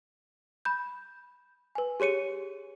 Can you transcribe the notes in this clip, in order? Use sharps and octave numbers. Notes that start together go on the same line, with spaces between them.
B5 G6
B4 G#5
G4 G#4 C#5 C#7 D#7